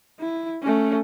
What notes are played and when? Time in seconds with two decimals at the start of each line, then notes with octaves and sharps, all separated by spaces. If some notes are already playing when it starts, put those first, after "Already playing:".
0.20 E4
0.62 A3 C#4